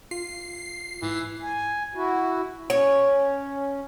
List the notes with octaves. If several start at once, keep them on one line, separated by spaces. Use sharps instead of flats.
F4 C7
G#2 E3
G#5
E4 F#4
C#4 C#5